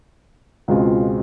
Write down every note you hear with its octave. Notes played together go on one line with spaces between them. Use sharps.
C#2 B2 G#3 C4 F4